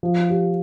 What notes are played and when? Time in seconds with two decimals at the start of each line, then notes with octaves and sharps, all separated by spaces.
0.03 F3
0.29 G4